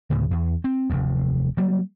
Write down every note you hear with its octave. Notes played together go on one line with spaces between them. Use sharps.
D2 A2 C#3
E2
C4
F1 D#2
F#3 G3 A#3